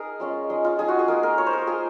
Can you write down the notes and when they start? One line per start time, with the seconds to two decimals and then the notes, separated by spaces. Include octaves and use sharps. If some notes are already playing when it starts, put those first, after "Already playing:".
Already playing: D#4 G#4 A#4
0.20 G#3 C#4 F4
0.50 G#3 D#4
0.64 F4
0.79 G#3 D#4 G#4
0.88 F#4
0.99 G#4
1.08 A#3 F4 A#4
1.23 A#4
1.38 A#3 F4 C#5
1.47 C5
1.53 A#4
1.67 A#3 F4 G#4